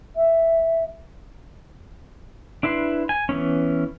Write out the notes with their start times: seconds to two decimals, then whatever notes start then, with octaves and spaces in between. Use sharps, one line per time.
0.16 E5
2.63 D4 E4 B4 C6
3.09 G#5
3.29 E3 B3 C#4